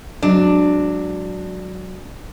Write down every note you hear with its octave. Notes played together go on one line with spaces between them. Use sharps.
F#3 G#3 C4 D4